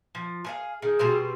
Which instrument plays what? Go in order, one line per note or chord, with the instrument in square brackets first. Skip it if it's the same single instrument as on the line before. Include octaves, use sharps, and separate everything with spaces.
[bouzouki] F3
G#4 A#4 F5
[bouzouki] D#3 [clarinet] G#4
[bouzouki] B2 G3 C4